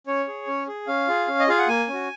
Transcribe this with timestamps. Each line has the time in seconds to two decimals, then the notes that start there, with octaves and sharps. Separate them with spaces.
0.07 C#4 C#5
0.27 G#4
0.47 C#4
0.68 G#4
0.87 C#4 F5
1.08 F4 G#4
1.28 C#4
1.40 D#5
1.48 F4 G#4 F5
1.59 F#5
1.68 A#3 G#5
1.88 C#4 F#4